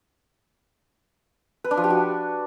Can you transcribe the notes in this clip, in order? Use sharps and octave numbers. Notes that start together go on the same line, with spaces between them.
B4
D4
F3
G4
F#4